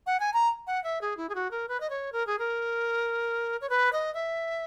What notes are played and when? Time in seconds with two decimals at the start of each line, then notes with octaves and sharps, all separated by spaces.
0.07 F#5
0.20 G#5
0.34 A#5
0.67 F#5
0.84 E5
1.01 G#4
1.17 E4
1.29 G#4
1.35 F#4
1.51 A#4
1.68 B4
1.80 D#5
1.90 C#5
2.13 A#4
2.27 G#4
2.39 A#4
3.61 C#5
3.70 B4
3.93 D#5
4.14 E5